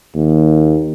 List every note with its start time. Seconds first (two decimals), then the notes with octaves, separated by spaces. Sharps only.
0.15 D#2